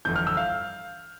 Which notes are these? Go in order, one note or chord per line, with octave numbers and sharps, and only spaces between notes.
G1 F2 E3 G6
F6
E6
F5